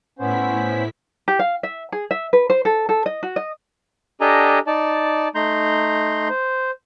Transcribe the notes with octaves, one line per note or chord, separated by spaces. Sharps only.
A2 B3 C#4 E4 C5 B6
G4
F5
E5
G#4
E5
B4
C5
A4
A4
D#5
F#4
D#5
D4 G4 A4 D#5 G#5 A#5
D#4 D5 A5
A3 D#4 A#5 C6 G6
C5